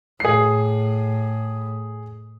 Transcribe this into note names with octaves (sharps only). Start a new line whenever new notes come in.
A2 G#4 C7